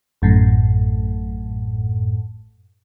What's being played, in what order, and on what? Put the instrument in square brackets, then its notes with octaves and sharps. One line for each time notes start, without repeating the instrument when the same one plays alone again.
[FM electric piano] A1 F#2 A2